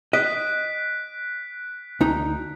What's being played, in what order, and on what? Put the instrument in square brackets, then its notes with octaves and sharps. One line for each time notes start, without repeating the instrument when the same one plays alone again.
[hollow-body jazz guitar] D#5 [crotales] F#6 B6 D7
[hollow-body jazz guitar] D2 D#4